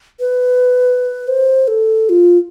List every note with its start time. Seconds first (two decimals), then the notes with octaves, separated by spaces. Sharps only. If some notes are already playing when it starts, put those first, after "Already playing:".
0.20 B4
1.28 C5
1.68 A4
2.09 F4